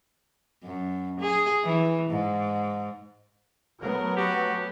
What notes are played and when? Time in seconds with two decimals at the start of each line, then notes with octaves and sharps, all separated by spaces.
0.64 F#2
1.20 G#4
1.64 E3
2.10 G#2
3.82 F#3 A3 B3 A#4
4.17 F#4 G4